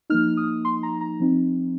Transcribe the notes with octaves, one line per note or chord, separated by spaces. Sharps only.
F3 A#3 D#4 F6
D#6
C6
A#5
A#5
F3 C4 D#4